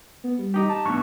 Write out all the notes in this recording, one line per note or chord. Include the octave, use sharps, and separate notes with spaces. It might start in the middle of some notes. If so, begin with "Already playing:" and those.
B3
G3
D#4 G4
A5
G2 B2 C#6